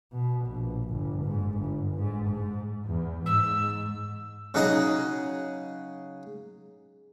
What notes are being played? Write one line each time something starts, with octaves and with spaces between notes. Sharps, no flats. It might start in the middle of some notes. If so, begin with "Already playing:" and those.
B2
A#1
G1
G#2
G1
G#2
G#2
E2
G#2 E6
C#3 F#3 D#4 G#4 D#5